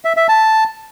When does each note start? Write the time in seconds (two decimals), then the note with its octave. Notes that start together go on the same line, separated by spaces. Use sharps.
0.05 E5
0.17 E5
0.29 A5